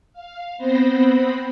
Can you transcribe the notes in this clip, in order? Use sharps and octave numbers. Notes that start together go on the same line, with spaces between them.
F5
B3 C4 C5 B5 A#6